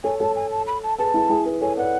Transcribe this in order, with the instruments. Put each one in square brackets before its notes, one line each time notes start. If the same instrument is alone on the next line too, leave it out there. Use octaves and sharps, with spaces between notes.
[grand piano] A4 C#5 [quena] G#5
[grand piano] A4 C#5 [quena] A5
[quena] G#5
A5
B5
A5
[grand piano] G#4 B4 [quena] A5
[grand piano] E4 G#4
E4 G#4
G#4 B4
[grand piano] A4 C#5 [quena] G#5
[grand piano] B4 D5 [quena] F#5